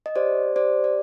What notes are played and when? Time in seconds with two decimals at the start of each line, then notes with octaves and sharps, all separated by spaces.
0.06 D#5
0.16 G4 C5 D5
0.56 G4 C5 D5
0.84 D5